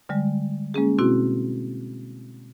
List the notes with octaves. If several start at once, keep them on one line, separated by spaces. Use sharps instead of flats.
D3 G3 G#3
G#3 A#3 C#4 G#4
B2 C4 E4 F#4